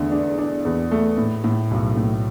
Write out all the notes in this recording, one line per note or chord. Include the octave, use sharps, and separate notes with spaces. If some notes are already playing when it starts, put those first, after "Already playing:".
Already playing: E2 D3 A3
D4
D4
E2
A3
A2
A2
B1
A2